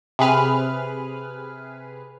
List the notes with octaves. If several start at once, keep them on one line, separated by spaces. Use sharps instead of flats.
C3 G#4 B4 F6